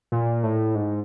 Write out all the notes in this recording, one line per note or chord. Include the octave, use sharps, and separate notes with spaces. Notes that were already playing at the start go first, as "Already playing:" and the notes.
A#2
A2
G#2